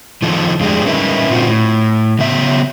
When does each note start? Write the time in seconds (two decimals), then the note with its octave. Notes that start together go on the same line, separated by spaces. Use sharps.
0.22 D#3 F3 A4
0.60 F2 G#3 D4 G4
0.86 G3 C#4 D#4 A#4 B4 E5
1.30 A#2 D3 C4 F4 F#4
1.48 A2
2.19 C#3 F#3 B3 E5